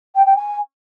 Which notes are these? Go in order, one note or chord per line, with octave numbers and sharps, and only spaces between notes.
G5
G5
G#5